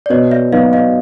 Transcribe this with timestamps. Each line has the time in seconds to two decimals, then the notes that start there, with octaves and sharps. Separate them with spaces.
0.06 D5
0.10 B2 C#5 D#5
0.31 D5 E5
0.52 F#3 B3 D#4 D#5 F5
0.73 D#5 F5